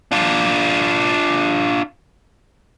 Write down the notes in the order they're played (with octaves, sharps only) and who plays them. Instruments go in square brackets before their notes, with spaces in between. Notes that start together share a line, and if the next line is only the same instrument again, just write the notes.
[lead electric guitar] D4 F4